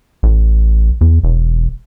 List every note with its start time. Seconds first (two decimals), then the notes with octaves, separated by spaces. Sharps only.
0.23 A1
1.01 E2
1.24 E1